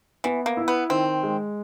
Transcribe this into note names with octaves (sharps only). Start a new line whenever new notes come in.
E3 B3
A#3
E4
B3
D#3 C4
G#3